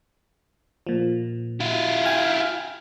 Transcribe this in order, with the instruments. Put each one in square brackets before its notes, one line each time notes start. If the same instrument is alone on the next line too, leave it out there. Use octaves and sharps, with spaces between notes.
[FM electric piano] A#2 F3
[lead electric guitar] E4 F4
[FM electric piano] G5 G#5 F6